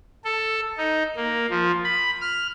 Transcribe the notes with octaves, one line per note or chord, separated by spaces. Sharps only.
A4
D#4
A#3
F3
B5
F6